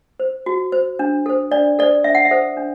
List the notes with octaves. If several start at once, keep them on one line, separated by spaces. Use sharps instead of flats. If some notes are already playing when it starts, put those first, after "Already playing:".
C5
F#4
C5
D4
A4 C5
D4 D5
A4 C5 D5
D4 E5
F#5
E5
A4 C5
D4